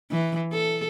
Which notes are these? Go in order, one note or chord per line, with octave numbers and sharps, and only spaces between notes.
E3
A4